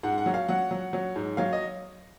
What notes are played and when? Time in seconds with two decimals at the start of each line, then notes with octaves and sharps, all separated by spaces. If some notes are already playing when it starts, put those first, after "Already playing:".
0.03 G#2 F#5
0.18 F#5
0.26 F#3
0.34 F5
0.48 F#3 F#5
0.71 F#3
0.93 F#3
1.16 G#2
1.37 F#3 F5
1.53 D#5